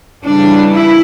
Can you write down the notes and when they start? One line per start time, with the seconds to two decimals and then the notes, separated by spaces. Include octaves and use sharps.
0.24 C#3 E3 G3 D4
0.73 E4